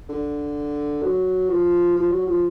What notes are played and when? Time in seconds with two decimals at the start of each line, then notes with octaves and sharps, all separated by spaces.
0.09 D3
1.02 F#3
1.49 F3
1.96 F3
2.11 F#3
2.26 F3